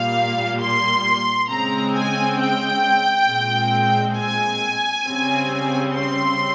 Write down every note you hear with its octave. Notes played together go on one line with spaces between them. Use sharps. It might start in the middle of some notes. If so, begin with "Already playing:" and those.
Already playing: A#2 G3 A#3 F5
C6
C#3 G#3 C4 A#5
G#5
G5
A#2 G#3 C4
G#5
C#3 G3 C4
C6